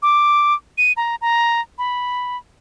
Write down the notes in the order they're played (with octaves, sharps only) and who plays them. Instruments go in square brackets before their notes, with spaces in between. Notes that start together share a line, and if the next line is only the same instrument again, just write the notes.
[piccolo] D6
D#7
A#5
A#5
B5